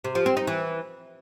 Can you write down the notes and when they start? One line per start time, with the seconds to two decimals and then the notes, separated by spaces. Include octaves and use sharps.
0.04 C3
0.15 F3
0.26 C4
0.37 D#4
0.47 E3